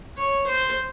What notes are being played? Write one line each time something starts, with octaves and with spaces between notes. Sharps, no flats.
C#5
C5